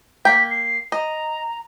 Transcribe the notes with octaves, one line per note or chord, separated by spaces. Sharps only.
A#3 G5 B6
C7
D#5 A#5